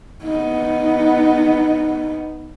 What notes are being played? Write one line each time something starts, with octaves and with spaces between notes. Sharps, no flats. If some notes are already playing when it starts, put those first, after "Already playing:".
B3 D#4